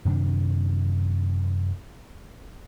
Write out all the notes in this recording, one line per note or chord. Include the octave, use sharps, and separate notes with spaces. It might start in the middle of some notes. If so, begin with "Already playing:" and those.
F#2 C3 D#3 D4